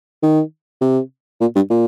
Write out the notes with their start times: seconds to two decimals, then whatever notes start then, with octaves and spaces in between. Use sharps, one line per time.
0.23 D#3
0.81 C3
1.41 A#2
1.56 G2
1.70 A#2